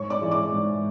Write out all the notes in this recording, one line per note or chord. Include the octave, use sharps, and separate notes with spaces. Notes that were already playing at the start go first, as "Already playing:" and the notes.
Already playing: G#2 C#5 C#6
D5 D6
E3 G#3
D5 D6
G#2